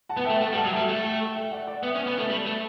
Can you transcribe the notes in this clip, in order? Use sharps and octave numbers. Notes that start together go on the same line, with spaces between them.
F#5 A5
B3
E5 G5
A3
A3 F#5 A5
G3
F#5 A5
F#3
E5 G5
G3
A3
E5 G5
E5 G5
D5 F#5
D5 F#5
B3 E5 G5
C#4
B3
A3
G3
A3